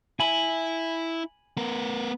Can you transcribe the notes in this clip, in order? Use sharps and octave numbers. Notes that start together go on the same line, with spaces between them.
E4 G#5 B5
B3 A#4